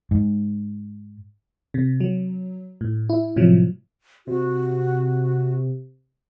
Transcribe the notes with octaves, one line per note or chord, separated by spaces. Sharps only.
G#2
C3
F#3
A2
E4
A2 C3 F3 F#3
C3 F#4